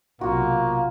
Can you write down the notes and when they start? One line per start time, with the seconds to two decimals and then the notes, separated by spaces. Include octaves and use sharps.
0.21 B1 C3 A#3 F4 F#4